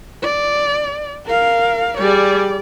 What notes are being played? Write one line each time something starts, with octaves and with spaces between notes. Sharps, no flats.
D5
A#4 F5
G3 G#4 D5